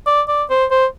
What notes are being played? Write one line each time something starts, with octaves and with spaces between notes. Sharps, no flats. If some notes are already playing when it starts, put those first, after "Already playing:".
D5
D5
C5
C5